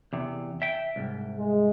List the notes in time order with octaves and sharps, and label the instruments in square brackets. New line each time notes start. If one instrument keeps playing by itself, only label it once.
[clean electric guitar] E2 C3
E5 G5
C2 G#2
[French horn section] G#3